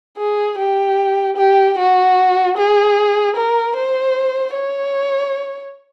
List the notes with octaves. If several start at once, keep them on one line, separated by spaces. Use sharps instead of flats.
G#4
G4
G4
F#4
G#4
A#4
C5
C#5